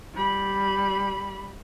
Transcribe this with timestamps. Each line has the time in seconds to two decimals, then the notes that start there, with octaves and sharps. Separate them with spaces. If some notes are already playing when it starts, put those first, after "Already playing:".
0.14 G3 B5